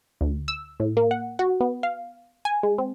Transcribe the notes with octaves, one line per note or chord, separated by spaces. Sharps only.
D2
E6
A2
A#3
F#5
F#4
B3
F5
G#5
G#3
C4